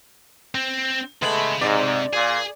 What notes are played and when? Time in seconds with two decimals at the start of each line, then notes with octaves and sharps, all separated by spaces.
0.55 C4
1.22 C#3 G#3 A3 B3 B5
1.61 G#2 C3 D5
2.13 A#2 G#4